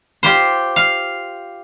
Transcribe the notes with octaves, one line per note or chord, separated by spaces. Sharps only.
F4 G4 C5
F5